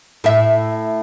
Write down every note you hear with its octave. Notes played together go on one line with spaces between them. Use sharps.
A2 E5